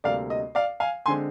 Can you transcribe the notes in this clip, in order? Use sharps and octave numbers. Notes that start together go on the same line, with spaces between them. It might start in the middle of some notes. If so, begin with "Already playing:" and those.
D2 C3 G3 A#3 D5 F5
D#5
D5 F5
F5 G#5
D3 G#3 C4 G#5 C6